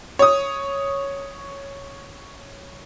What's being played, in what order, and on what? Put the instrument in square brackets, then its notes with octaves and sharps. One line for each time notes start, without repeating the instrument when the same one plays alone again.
[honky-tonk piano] C#5 D#6